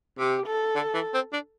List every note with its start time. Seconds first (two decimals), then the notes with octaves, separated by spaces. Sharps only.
0.19 C3 G4
0.47 A4
0.75 D3
0.94 E3
1.14 C4
1.33 D4